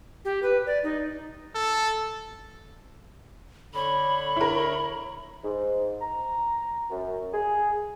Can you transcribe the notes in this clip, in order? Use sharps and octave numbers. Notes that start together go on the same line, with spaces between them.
G4
B4
D5
D#4
A4
D3 C#5 B5
E4 A#4
G#2
A#5
F#2
G#4